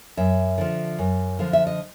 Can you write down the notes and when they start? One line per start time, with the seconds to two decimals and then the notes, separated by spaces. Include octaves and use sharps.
0.17 F#2 E5
0.58 D3 F3
0.98 F#2
1.39 D3 F3 F5
1.53 E5
1.67 D#5